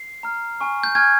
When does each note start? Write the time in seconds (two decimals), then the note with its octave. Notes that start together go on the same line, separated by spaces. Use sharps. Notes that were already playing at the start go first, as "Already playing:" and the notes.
Already playing: C7
0.23 A#5 F6
0.59 G#5 C#6 F6
0.83 G6
0.95 G#5 C#6 F6 G#6